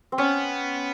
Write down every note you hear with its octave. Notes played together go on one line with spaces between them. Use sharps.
C4
B3 C#4